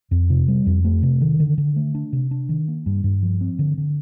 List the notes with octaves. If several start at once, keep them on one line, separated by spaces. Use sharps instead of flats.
F2
C3
G3
F2
A3
C3
D#3
D3
D3
A3
D4
C3
D4
D#3
A#3
G2
G2
F3
C4
D3
D3